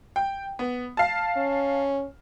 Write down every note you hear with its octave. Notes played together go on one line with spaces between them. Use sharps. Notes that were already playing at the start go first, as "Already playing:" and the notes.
G5
B3
F5 A5
C#4